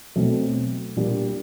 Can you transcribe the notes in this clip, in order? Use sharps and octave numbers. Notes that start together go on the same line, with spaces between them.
B2 F#3 A3 C4
A#2 G3 A#3 D4